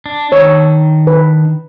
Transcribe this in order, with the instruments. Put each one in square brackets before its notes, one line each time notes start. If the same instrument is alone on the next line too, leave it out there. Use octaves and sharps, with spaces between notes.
[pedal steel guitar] D4
[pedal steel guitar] D#3 D4 E6 [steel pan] C#5
[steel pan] B4